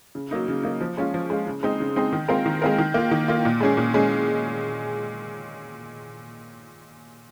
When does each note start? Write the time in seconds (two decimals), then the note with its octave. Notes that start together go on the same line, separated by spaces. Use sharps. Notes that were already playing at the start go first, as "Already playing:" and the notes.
0.15 C#3
0.31 F#3 A#3 D#4
0.48 C#3
0.63 F#3 A#3 D#4
0.81 F3
0.97 G#3 C#4 F4
1.14 F3
1.30 G#3 C#4 F4
1.47 C#3
1.63 G#3 C4 D#4
1.80 C#3
1.96 G#3 C4 D#4
2.13 D#3
2.28 G#3 C4 F4 A#4
2.46 D#3
2.62 G#3 C4 F4 A#4
2.78 D#3
2.94 A#3 F4
3.11 D#3
3.28 A#3 F4
3.45 A#2
3.61 G#3 C#4 G#4
3.77 A#2
3.94 G#3 C#4 G#4